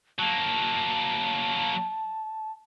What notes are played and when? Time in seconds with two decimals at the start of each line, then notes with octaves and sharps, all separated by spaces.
0.19 F#3 A#3 A5